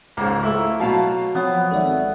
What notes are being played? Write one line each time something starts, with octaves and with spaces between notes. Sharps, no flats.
C#2 G#2 A#3
A3 E4
B2 F#3 F5 A5
F3 B3 C4 C#5
G#1 A4 D5 E5